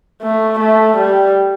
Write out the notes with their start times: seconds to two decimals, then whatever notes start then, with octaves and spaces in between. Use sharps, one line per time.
0.22 A3
0.59 A3
0.97 G3